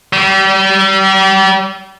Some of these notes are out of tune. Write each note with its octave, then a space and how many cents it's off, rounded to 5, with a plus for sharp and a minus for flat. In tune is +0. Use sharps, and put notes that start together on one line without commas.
G3 -35